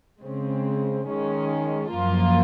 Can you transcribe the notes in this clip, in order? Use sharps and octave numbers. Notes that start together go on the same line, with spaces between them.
C#3 G#3 C4
D#3 G#3 C#4
F#2 F3 A#3 F4